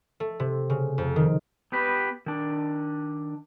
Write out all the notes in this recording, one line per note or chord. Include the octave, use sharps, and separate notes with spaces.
A3
C3
C#3
F2
D#3
B3 G4 B4
D#3 D4